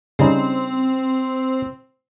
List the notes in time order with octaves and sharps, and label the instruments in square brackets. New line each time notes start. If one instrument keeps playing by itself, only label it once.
[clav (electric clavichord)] C#3 G3 D#4 [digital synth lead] C4